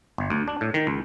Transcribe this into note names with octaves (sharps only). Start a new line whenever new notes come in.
G1
D2
D4
A2
D#3
C#2